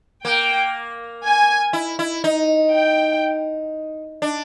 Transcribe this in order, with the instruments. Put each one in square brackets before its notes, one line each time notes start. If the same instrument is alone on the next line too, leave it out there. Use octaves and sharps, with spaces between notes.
[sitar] A#3 [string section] G5
[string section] G#5
[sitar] E4
E4
D#4
[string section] G5
[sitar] D4